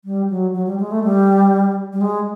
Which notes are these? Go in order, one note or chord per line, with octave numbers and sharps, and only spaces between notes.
G3
F#3
F#3
G3
G#3
A3
G3
G3
G#3